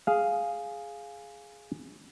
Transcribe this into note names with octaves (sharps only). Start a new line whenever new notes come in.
G#4 F5